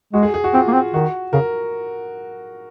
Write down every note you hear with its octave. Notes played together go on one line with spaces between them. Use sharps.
G#3 F#4
G#4
G#4
F#4
C4 F4
A#3
C4
D#3 F#4
C#3 A#4